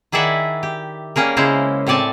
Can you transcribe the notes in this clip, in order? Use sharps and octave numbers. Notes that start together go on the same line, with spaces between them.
D#3 E4 G#4 D5 E5 F#5
G4
G3 A#3 C#4 G#4 A#4
C#3 G#3 C#4 E4 C5 A#5
A2 C4 C#5 D5 G#5 A5